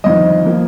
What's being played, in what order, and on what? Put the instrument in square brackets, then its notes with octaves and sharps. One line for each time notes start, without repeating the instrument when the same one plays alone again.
[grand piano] G1 F2 D#3 D#5
F3 A#3